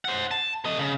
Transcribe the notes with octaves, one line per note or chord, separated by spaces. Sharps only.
C5 F#5
A5
A3 D#5
C#3